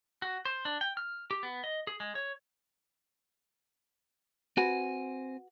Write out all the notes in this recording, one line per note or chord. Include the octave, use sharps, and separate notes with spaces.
F#4
C5
D4
G5
F6
G4
B3
D#5
G#4
G#3
C#5
C4 F#4 B4 C5 G#5